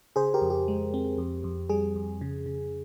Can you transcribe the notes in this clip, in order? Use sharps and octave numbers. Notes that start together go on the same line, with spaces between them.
C#3 G#4 C5
G4 A#4
F2
G4
G#3
C4
F2
F2
G3 G#4
F2
C#3
C#3